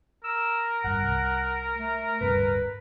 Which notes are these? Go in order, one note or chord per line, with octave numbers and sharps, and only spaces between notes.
A#4 E6
G#1 G2 F#5
C2
A3
D1 G2 C3 B4